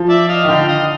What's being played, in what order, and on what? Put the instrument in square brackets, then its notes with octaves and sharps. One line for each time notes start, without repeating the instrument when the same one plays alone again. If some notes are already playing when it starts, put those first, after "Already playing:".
Already playing: [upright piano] F3
[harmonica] D5 E5
D#5 F5
[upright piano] D#3
[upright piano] D3 [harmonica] F5 G5
[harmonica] D#5 F5